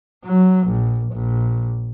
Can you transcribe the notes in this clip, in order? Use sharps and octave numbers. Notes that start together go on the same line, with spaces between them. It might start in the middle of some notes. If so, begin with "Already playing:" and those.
F#3
A#1
A#1